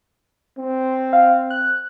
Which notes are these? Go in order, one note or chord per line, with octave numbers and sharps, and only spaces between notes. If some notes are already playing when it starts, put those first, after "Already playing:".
C4
F5
F#6